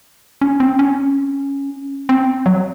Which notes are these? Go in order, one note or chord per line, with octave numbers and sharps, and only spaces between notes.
C#4
C4
C#4
C4
F#3